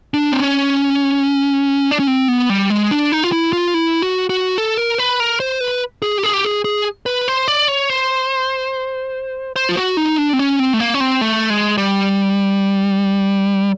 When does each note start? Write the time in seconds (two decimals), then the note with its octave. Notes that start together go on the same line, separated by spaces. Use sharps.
0.14 D4
0.32 C4
0.42 C#4
1.91 D4
1.99 C#4
2.07 C4
2.28 B3
2.50 G3
2.70 G#3
2.91 D4
3.12 D#4
3.24 F4
3.32 E4
3.53 F4
3.74 E4
4.02 F#4
4.30 F#4
4.58 A4
4.78 A#4
4.98 B4
5.20 A#4
5.40 C5
5.60 B4
6.02 G#4
6.18 G4
6.23 G#4
6.33 G4
6.45 G#4
6.65 G#4
7.06 B4
7.28 C5
7.48 D5
7.68 C#5
7.90 C5
9.56 C5
9.69 F4
9.77 F#4
9.97 D#4
10.18 D4
10.33 C4
10.39 C#4
10.59 C4
10.74 A3
10.80 A#3
10.94 C#4
11.00 C4
11.21 A3
11.50 G#3
11.77 G3